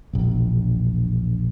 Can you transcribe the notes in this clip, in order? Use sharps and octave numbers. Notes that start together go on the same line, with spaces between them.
E1 A#1